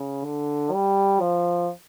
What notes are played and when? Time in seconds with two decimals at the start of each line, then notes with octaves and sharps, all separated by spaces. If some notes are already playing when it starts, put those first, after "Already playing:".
Already playing: C#3
0.25 D3
0.73 G3
1.20 F3